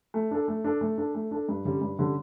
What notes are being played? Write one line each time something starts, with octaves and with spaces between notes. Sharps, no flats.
A3
D4 A4
A3
D4 A4
A3
D4 A4
A3
D4 A4
G2
D3 G3 C#4
G2
D3 G3 C#4